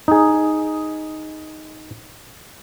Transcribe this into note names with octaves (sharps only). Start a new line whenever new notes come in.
D#4 G#4